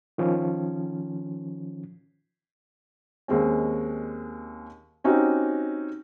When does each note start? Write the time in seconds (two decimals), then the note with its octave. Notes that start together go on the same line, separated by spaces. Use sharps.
0.18 D#3 F3 C#4
3.28 D#2 G#3 C4 C#4
5.04 C4 C#4 D#4 F#4 G4